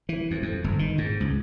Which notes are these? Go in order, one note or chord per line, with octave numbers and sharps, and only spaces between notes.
E3
F2
F2
G1
D#3
G#2
C#2